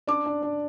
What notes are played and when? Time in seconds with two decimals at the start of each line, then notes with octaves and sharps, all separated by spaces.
0.07 D4 D5 D6
0.26 D4
0.42 D4